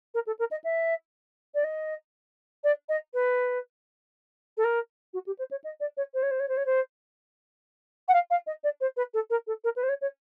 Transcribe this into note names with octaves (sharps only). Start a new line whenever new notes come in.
A#4
A4
A#4
D#5
E5
D5
D#5
D5
D#5
B4
A4
A#4
F#4
G4
C5
C#5
D#5
D5
C#5
C5
C#5
C5
C#5
C5
C#5
C5
F#5
F5
F5
D#5
D5
C5
B4
A4
A#4
A4
A#4
B4
C5
C#5
C#5